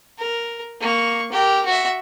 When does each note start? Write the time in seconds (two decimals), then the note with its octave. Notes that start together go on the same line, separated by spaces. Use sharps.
0.18 A#4
0.81 A#3 C#6
1.32 G4 A#4
1.66 F#4 E5